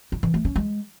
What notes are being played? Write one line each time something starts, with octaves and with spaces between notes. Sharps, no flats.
E4
E3
A3
C#4
G#3